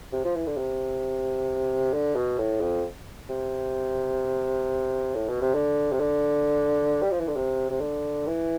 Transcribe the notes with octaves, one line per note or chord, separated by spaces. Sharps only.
C3
F3
E3
D3
C3
D3
B2
A2
F2
C3
A2
B2
C3
D3
C3
D3
G3
F3
E3
D3
C3
C3
D3
E3